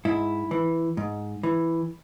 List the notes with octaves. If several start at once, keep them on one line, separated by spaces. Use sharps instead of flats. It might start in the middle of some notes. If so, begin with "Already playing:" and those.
G#2 E4
E3
G#2
E3